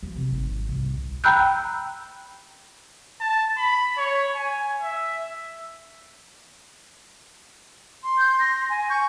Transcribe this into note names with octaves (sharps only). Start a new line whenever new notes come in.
F3
C3
G#1
C2
G5 A#5 B5 E6 F#6 G6
A5
B5
C#5
G#5
E5
C6
G6
A#6
G#5
C#6 G6